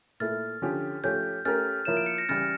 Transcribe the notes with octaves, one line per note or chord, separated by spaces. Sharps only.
A#2 A3 E4 F6 A6
D3 F3 C#4 G4
F3 A3 C#4 G4 C#5 G6
A3 C#4 G4 A#4 F6 A6
F3 A#3 E4 A#4 C#5 E7
D7
C#7
A#6
C#3 E3 G3 F6 A6